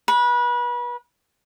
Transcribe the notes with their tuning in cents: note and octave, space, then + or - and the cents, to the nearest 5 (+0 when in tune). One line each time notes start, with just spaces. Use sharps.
B4 -30